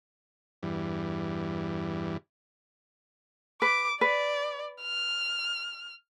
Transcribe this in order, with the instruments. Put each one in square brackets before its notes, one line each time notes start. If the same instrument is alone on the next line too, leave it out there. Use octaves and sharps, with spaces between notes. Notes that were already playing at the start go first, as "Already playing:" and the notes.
[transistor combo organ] E2 G2
[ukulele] B4 [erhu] D6
[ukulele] B4 [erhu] D5
[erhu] F6